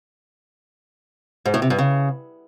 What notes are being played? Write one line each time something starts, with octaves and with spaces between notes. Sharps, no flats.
G#2
A2
C3
G2
C#3